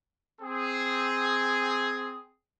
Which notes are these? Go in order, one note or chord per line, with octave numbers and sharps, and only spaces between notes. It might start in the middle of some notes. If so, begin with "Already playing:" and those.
C4 G#4